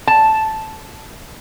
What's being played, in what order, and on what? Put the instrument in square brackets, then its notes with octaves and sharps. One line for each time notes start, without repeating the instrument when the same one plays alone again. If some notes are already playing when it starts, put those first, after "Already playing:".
[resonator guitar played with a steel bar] A5